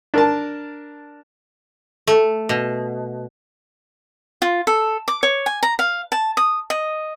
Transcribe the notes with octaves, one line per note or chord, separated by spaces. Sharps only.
D4 A#4 A5
A3
B2
F4
A4
D6
C#5
G#5
A#5
F5
A5
D#6
D#5